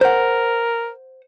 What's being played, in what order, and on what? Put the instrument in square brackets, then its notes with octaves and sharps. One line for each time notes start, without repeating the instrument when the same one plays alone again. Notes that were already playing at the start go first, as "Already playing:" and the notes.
[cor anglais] A#4 [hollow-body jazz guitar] C5 F#5